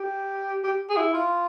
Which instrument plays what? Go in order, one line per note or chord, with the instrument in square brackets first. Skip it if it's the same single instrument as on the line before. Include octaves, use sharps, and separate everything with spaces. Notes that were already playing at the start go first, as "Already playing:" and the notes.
Already playing: [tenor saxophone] G4
G4
G#4
E4
F4